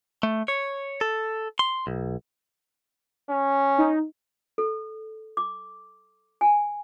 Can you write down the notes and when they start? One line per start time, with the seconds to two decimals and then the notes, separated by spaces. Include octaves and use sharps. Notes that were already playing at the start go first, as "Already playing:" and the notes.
0.23 A3
0.48 C#5
1.01 A4
1.59 C6
1.87 B1
3.30 C#4
3.78 D#4
4.58 A4
5.37 D6
6.41 G#5